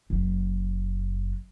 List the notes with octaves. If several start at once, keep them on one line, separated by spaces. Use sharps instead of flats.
F#1 F#3